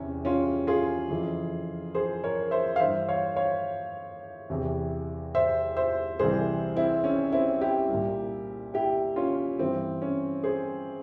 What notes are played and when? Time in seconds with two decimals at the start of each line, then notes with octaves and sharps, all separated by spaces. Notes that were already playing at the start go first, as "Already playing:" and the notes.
Already playing: E2 C3 E3 C#4
0.25 C#4 F4
0.67 F4 G#4
1.10 F2 C#3 E3
1.94 G#4 C5
2.24 A#4 C#5
2.51 C5 E5
2.76 F5
2.79 G2 E3 C5 E5
3.08 C#5 F5
3.36 C#5 F5
4.50 E2 C3 E3
5.35 C5 E5
5.77 C5 E5
6.19 C2 C3 E3 G#4 C5
6.76 C4 E4
7.04 C#4
7.32 C4 E4
7.61 E4 G4
7.89 C2
7.94 A#2
8.74 E4 G4
9.16 C#4 F4
9.59 G2 E3 C4
10.02 C#4
10.44 G#4 C5